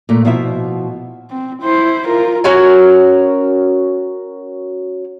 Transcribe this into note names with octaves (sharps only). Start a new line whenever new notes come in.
A#2 A3
B2 F3 E4 E5
C4
E4 C5
F4 A#4
C#4 F#4 A#4 G#5